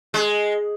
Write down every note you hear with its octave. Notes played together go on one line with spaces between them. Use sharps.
G#3